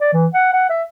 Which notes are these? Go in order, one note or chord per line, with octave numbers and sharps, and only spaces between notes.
D5
E3
F#5
F#5
E5